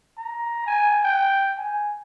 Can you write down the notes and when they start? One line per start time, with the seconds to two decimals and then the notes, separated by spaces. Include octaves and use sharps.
0.17 A#5
0.66 G#5
1.04 G5
1.58 G#5